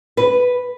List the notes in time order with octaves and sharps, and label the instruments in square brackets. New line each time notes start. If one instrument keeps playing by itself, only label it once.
[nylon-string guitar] B4